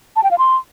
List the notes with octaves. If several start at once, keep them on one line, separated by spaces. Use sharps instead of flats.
A5
G5
F5
C6